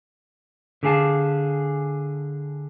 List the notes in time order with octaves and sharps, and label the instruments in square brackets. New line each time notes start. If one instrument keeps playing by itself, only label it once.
[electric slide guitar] D3 G4 G#4 F5 A5